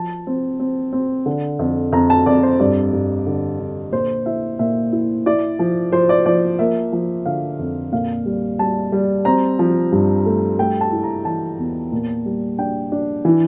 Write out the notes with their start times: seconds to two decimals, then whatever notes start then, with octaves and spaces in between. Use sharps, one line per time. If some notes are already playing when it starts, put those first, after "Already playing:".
Already playing: F3 A5
0.27 C4
0.60 C4
0.93 C4
1.26 D3
1.59 F2
1.93 F2 A#5
2.10 A5
2.26 F2 D5
2.43 C5
2.60 G2 D5
2.93 G2
3.26 D3
3.60 D3
3.92 A#2 C5
4.26 E4 E5
4.59 A#2 E5
4.93 E4
5.26 E4 D5
5.59 F3
5.92 F3 C5
6.09 D5
6.26 F3 D5
6.59 A#3 E5
6.93 F3
7.26 D3 F5
7.59 F2
7.92 A#2 F5
8.26 G3
8.59 G3 A5
8.92 G3
9.25 C4 A#5
9.59 F3
9.92 G2
10.26 A3
10.59 A3 G5
10.81 A5
10.92 E4
11.03 A#5
11.25 E3 A5
11.59 E2
11.92 A#2
12.26 G3
12.58 D4 G5
12.92 D4
13.25 E3